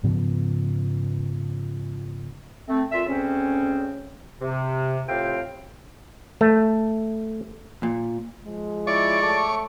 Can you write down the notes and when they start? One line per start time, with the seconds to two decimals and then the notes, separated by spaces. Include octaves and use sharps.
0.03 G#2 C#3 F3 B3
2.68 A3 C4
2.92 A#2 A3 F4 E5
3.07 D2 C#3 C4 C#4
4.40 C3
5.08 A2 C3 C4 F4 F5 G5
6.41 A3
7.83 A#2
8.44 F3 G#3
8.87 E4 C#5 D5 C#6 D6
9.23 A3